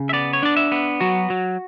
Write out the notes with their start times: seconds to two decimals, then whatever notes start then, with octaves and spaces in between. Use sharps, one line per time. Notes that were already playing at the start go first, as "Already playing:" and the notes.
Already playing: C#3
0.09 E5
0.13 B3 D5
0.33 C#5
0.43 D4 D5
0.57 E5
0.72 B3
1.01 F#3 F#4
1.30 F#3